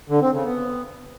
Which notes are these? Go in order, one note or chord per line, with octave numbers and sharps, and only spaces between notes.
D3
C4
C#3
B3